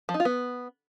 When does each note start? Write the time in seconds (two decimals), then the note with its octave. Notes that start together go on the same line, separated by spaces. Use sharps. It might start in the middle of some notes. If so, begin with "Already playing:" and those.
0.09 F3
0.14 D#4
0.20 F4
0.25 B3